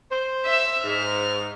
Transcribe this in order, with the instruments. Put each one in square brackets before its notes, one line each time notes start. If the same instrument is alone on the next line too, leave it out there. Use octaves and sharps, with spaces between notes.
[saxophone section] C5
[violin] E5 E6
[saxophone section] G#2 [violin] F6